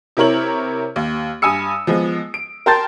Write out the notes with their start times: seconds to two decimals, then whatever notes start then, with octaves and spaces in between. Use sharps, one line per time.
0.17 C3 E4 A#4 C#5 F#7
0.96 D#2
1.42 G2 G#5 D#6 E6 C#7
1.87 F3 G#3 B3
2.34 D7
2.66 A#4 G5 A5 C6 G6 A6